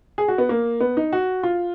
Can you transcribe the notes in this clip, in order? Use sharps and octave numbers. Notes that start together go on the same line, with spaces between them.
G#4
F#4
B3
A#3
B3
D#4
F#4
F4